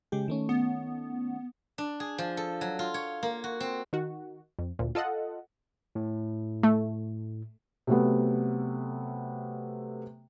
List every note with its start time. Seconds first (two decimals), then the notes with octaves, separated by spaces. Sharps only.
0.12 C#3 G#3 G4
0.28 D#3 A3 C#4
0.49 B3
1.78 D4
2.00 G#4
2.18 F3
2.37 A4
2.61 F#3
2.79 F4
2.94 C#5
3.23 A#3
3.44 F#4
3.60 C4
3.93 D#3 F#4
4.59 F2
4.79 D2 A#2
4.95 F4 A4 D#5 F#5
5.95 A2
6.63 A3
7.87 C3 F#3 A3 B3